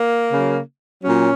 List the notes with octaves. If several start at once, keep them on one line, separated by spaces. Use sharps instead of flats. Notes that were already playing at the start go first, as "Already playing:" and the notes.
Already playing: A#3
C#3 F#3
A#2 F#3 C#4